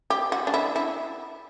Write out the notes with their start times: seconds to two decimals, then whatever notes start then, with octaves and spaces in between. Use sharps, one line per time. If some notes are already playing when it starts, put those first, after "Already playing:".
0.10 G4
0.32 F#4
0.47 D4
0.54 E4
0.76 E4